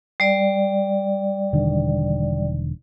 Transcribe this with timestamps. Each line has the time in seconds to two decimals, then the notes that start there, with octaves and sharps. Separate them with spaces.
0.20 G3 D5
1.53 E1 D3 D#3